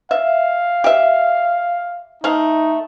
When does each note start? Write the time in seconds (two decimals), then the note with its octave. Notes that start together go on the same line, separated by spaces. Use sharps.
0.11 E5 F5
0.84 G4 E5
2.24 A3 D#4 F5